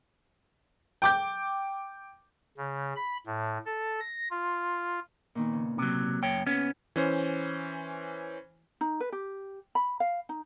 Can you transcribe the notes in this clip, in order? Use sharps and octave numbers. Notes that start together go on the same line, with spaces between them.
G5 D6 G6
C#3
B5
A2
A4
A#6
F4
A#2 D#3 B3
C#3
C3 F#3
F#2 C#5 G5 A5
B3 C#4 G#5
E3 C#4 C5
D#4
B4
G4
B5
F5
D#4